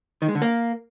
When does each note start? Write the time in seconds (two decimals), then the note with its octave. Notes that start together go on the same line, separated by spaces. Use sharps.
0.22 D#3
0.28 G#3
0.35 D3
0.42 A#3